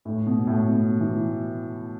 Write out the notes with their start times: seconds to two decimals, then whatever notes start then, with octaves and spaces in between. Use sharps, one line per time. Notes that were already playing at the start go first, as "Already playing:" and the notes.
0.05 A2
0.27 B2
0.47 A2
0.68 B2
1.00 E3